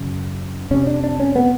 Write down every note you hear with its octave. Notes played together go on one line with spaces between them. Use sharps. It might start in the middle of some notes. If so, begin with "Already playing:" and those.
Already playing: F#2 C#3
F2 C3 C#4
D4
D4
C#4
B3